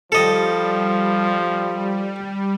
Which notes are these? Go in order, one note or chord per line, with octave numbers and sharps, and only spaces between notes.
F3 G3 A4 D#5